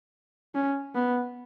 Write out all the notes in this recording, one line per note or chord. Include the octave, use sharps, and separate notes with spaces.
C#4
B3